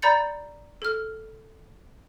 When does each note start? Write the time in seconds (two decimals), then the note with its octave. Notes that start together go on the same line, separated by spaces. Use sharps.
0.02 D5 A#5 B5 G6 A6 C#7
0.82 A4 F6